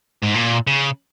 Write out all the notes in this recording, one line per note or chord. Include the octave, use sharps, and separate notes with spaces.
G#2
A#2
C#3